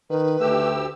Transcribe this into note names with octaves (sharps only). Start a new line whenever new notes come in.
D#3 B4
D2 A3 G4 E6